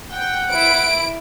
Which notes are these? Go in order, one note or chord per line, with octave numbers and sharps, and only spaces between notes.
F#5 G5
E4 D7